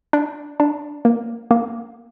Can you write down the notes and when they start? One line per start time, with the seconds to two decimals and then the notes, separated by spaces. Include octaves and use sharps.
0.13 D4
0.60 D4
1.05 A#3
1.51 A#3